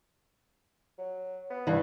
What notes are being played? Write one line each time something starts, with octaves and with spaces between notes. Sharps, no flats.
F#3
B3
G2 E3